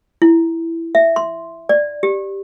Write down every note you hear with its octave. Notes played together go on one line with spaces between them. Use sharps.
E4
E5
C6
D5
G4